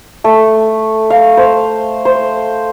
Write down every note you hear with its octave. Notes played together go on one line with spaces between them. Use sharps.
A3
F5
C5
C5